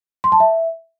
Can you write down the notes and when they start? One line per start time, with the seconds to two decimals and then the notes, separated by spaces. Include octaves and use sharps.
0.24 C6
0.32 A5
0.40 E5